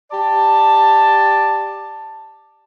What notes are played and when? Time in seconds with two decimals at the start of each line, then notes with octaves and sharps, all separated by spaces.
0.12 G4 D5 A5